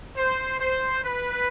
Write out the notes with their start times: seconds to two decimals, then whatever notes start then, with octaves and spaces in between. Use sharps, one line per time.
0.16 C5
0.59 C5
1.04 B4